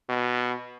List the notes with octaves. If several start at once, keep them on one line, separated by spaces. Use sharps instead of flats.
B2